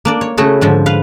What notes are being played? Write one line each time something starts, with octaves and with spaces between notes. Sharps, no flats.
A#3 D4 D5
C#5
C#3 A3 E4 F#4 G#4 A4
G#2 D3 F3
B4 F5